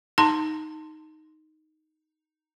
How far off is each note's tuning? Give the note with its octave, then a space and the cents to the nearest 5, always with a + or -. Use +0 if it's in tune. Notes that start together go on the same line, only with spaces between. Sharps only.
D#4 +0 A5 +30 C6 +0